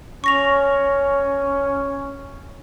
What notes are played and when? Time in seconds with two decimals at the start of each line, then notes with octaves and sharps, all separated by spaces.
0.24 C#4 C#6 A#6 F7